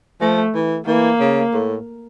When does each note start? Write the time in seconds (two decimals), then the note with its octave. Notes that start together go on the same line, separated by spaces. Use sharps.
0.21 F3 A3
0.54 E3
0.87 E3 A#3
1.20 C#3
1.53 A2